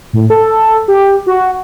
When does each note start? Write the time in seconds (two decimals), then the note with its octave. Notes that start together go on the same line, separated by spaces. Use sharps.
0.13 A2
0.30 A4
0.88 G4
1.27 F#4